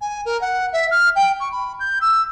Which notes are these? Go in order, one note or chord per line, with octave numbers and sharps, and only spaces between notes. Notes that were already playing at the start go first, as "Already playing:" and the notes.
G#5
A#4
F#5
E5
F6
G5
C#6
B5
G6
E6